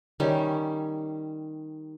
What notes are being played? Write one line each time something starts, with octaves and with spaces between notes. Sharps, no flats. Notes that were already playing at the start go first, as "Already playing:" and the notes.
D#3 G3 C#4